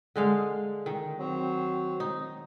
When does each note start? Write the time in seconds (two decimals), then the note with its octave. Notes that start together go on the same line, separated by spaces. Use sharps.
0.16 D3 G#3 F5
0.86 D#3
1.19 F#3 C4
2.00 D#4